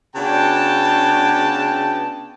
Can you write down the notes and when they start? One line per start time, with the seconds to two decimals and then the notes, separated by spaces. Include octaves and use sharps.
0.15 C#3 B3 D4 F#4 G5 A5